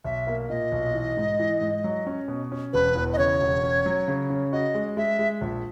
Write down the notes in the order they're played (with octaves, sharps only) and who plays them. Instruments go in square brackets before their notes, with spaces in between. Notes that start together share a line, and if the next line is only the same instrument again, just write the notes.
[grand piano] B1 [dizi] E5
[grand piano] A#3
[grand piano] A#2 [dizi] D#5
[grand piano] B1
E3
G#2
E3
G#2
F#3
C#4
B2
C#4
[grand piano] E1 [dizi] B4
[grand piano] E2
[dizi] D#5
[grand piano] C#3 [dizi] C#5
[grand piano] E1
C#4
F#3
C#3
C#4
[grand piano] F#4 [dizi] D#5
[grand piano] G#3
[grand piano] G#3 [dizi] E5
[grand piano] G#3
A#1